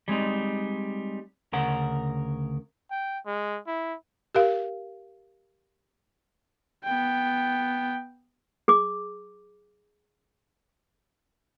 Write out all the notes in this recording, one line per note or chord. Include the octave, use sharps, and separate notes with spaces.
G3 G#3 C4 D#4
D2 C#3 A#4 F#5
G5
G#3
E4
G4 A#4 F5
B3 G5
G#4 D6